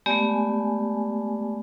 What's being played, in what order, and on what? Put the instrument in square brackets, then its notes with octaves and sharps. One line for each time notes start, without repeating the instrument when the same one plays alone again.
[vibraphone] G#3 A3 B3 G4 D5 G#5